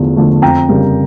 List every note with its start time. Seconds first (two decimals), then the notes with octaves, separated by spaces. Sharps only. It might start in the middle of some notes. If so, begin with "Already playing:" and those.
Already playing: E2 D3 F3 A3
0.16 D3 F3 A3
0.42 F2 G5 A#5
0.69 C#3 G3 A#3